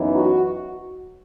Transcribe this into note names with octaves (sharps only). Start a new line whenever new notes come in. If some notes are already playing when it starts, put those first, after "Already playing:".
Already playing: F#2 E3 B3 D#4
F#4